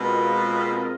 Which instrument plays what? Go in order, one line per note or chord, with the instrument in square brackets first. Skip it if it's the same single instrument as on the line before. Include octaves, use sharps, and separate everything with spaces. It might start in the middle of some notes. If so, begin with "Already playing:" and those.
Already playing: [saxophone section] B2 [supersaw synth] G#3 C4 F4 A#4 D#5